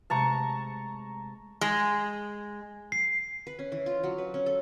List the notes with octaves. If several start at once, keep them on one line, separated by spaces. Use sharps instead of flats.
C3 G#3 A3 A5 A#5 C#6
G#3
C7
B4
C#4
E3
F4
F#3
B4
C#4
A4